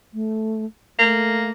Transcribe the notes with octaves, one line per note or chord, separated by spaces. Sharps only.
A3
A3 A#3